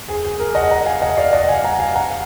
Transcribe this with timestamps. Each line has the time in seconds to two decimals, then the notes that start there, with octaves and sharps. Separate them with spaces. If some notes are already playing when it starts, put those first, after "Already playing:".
0.08 G#4
0.25 G#4
0.40 A#4
0.55 D#5 F#5
0.70 F#5 A#5
0.86 F5 G#5
1.02 D#5 F#5
1.17 D5 F5
1.33 D#5 F#5
1.44 F#5
1.49 F5 G#5
1.64 F#5 A#5
1.79 F5 G#5
1.94 F#5 A#5
2.10 F5